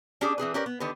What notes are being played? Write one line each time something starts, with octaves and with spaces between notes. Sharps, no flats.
C#4 D4 G4 G#4
E3 C4 G#4 B4
C#4 G4 A#4 B4 D5
B3
D3 D#3 G4 B4